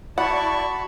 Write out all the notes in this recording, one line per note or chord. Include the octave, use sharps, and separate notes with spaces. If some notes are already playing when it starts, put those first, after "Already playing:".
E4 F#4 D5 F#5 A5 B5 C#6